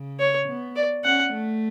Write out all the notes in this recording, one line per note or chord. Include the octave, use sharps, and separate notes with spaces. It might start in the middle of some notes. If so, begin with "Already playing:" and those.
Already playing: C#3
C#5
B3
D5
C#4 F#5
A3